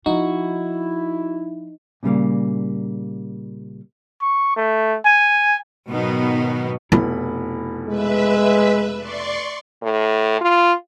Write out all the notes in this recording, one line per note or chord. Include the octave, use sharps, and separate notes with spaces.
F3 D#4 E4 F#4
A#2 C#3 G3 A#3
C#6
A3
G#5
G#2 B2 D#3 F#3 B3 D#4
F1 B2 E4 B5
G#3 B4 E5
D5 C6 C#6
A2
F4